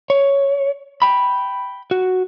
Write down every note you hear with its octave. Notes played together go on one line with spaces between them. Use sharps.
C#5
G5 B5
F#4